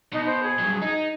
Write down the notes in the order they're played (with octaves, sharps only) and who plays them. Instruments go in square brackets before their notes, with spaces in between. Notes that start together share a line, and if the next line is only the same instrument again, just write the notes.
[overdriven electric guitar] B2 [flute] D#4
[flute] C5
G#4
[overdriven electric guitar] G2 F#3
D#4